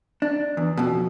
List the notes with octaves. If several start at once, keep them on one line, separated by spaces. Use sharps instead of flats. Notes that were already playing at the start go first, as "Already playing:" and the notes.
D4
E2
F2 B2